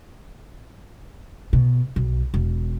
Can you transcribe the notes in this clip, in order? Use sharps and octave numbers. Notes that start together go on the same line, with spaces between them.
B2
B1
E1